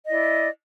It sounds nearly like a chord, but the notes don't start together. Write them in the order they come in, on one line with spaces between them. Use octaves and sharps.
D#5 E4 D5